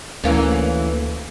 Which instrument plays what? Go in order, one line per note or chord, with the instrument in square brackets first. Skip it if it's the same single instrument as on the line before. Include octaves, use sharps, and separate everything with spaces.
[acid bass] D2 [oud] E3 A#3 C#4